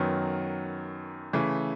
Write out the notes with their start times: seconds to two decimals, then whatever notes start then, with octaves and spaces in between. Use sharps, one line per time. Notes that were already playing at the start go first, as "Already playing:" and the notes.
Already playing: F#2 D#3 F#3 B3
1.33 C#3 E3 A3